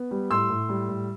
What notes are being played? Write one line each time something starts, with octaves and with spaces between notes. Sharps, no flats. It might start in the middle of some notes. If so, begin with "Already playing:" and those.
Already playing: B3
G3
A2 C6 E6
A2
G3
A2